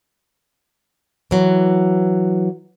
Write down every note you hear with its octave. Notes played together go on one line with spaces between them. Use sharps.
E3 F#3